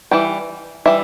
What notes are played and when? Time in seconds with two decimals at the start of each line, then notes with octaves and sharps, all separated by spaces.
0.11 E3 G3 G5
0.86 E3 G3 E5